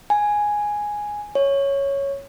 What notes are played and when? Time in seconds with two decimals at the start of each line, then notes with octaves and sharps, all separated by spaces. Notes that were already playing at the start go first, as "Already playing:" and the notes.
0.10 G#5
1.35 C#5